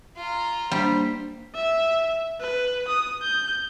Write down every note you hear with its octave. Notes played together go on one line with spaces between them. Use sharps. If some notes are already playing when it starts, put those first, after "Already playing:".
F4 A#5
G3 A#3 D4 C5 B6
E5
B4
D#6
G6